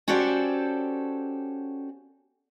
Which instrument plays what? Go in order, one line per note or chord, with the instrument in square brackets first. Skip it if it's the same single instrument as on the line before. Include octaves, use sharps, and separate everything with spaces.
[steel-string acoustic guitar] C#4 F#4 G4 A4 C5 D5